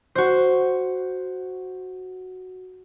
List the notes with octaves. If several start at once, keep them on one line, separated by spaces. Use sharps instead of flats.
F#4 C5